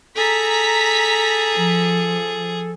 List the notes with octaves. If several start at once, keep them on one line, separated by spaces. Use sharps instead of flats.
G#4 A4 A#5 B6
F3